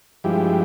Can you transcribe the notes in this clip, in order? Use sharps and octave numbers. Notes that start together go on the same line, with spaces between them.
G2 F3 G#3 E4 G4